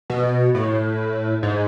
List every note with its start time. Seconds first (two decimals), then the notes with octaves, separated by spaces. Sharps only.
0.10 B2
0.55 A2
1.43 G#2